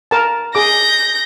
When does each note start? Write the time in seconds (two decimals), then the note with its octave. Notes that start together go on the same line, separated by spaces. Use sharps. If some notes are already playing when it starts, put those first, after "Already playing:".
0.11 A#4 A5
0.55 G#4 D6 G6 A#6